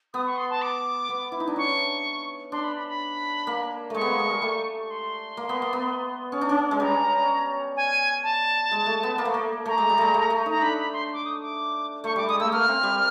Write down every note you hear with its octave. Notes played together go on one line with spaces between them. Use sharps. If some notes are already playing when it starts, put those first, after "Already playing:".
B3 D#6
C#6
C6
A5
D6
B3
E4
D#4
D4
C#4 C#6
D4 C6
B5
B5
B5
A#3
G#3 A3 C#6
B3
A#3
G#3
G3
A3
C#6
C6
A#3
B3
A#3
B3
C#4
D4
C#4
G#3
G3 A#5
G#5
A5
G#3
A3
B3
A#3
A3
A#3
A3 A#5
G#3
G3
G#3 A3
A3
A3
D#4 A#5
D4 B5
B5
C6
D6
D#6
D6
A3 C#6
G3 D6
G#3 D#6
A3 E6
A#3 F6
C4
G3